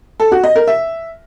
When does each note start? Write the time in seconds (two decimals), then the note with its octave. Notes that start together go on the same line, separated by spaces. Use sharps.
0.20 A4
0.32 F#4
0.44 D#5
0.55 A#4
0.67 E5